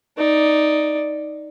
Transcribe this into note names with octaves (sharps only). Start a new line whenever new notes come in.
D#4 D5